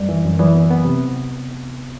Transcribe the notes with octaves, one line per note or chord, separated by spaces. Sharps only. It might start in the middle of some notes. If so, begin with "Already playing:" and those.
Already playing: F#2 G3
E3
F#2
E3 F#3
B3
B3
C3